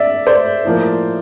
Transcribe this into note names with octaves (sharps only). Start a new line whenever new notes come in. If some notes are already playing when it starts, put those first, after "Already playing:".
Already playing: D5 E5
C5 D5
A2 F3 A#3